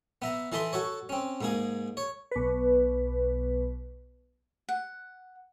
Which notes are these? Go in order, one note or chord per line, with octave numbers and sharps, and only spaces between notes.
B3 E5 A#5
E3 E4 A4 D#5 B5 C6
F#4 A4 C#5
C4 C#4
G#2 A#3 G#4
C#5
B1 B4
F#5